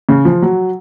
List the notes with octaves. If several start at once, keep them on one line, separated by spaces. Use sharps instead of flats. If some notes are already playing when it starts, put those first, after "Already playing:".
C#3
F3
F#3